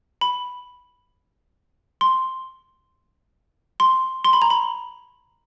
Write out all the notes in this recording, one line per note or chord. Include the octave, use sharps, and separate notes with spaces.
B5
C6
C6
C6
B5
A#5
B5